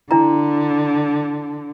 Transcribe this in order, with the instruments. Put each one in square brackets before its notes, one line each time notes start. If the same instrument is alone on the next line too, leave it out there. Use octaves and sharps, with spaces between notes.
[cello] D3 [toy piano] D4 E4 A#5